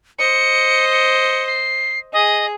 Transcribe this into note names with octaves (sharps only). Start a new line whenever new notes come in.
C5 D#5 C#7
C#7
C7
G#4 D#5